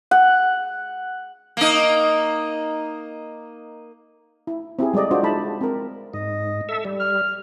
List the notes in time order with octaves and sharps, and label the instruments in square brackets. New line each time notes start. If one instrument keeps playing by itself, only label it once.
[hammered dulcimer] F#5
[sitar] A#3 D#4
[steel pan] E4
C4 E4 G4 G#4
G3 G#3 A4 D5 D#5
D4 F4 F#4 C5 D5
G#3 D#4 E4 D5 A5 B5
C4 A#4
[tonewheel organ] G#2 [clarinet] D#5
[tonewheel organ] A4 E5
G3
[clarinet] F6